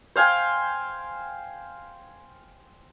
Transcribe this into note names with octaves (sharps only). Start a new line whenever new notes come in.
C5 F5 G5 G#5